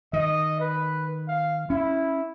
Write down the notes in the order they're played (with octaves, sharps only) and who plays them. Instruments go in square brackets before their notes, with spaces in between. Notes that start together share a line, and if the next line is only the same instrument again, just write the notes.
[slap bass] D#3 [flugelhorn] D#5
[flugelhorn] B4
F5
[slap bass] C#4 [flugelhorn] E4